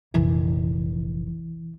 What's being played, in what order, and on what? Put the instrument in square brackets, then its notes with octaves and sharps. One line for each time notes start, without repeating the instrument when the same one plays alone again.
[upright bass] F1 A#1 [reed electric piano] E3